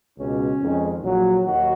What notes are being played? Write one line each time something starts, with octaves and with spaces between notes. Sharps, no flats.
C#2 B2 G#3 C#4
F2 D#3 G#3
A#1 A#2 F#3
D#2 D#3 F#3 F#4